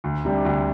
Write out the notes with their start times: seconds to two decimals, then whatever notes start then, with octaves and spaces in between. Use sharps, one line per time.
0.04 D2
0.25 C3 G3 D4
0.45 D2